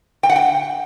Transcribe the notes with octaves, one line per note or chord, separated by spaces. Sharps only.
G5
F#5
G5